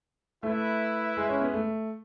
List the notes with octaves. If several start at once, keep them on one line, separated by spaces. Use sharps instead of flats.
A3 E4 B4 E5
G#3
C#4
B3
A3